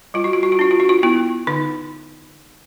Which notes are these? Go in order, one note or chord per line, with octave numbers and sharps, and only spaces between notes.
G3 F4
F#4
F4
F#4
F4
D4 F#4
F4
F#4
F4
B3 E4
D3 D#4